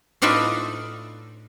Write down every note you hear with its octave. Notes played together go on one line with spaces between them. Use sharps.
A2 D4 D#4 F4 B4 E5